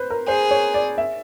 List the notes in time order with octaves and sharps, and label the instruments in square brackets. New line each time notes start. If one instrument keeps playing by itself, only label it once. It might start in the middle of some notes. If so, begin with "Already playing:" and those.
Already playing: [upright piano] B4 C5
A#4
[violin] G#4 [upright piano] C5
[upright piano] C#5
D5
E5